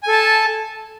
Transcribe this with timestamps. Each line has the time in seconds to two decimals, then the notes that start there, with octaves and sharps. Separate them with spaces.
0.03 G#5
0.08 A4
0.12 A5